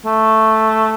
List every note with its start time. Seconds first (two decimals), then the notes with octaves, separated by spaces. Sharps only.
0.06 A3